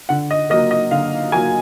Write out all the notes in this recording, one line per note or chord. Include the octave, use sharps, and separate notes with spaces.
D3 F#5
D#5
F#3 A#3 D#5
D#5
D3 F5
F#3 A#3 G#5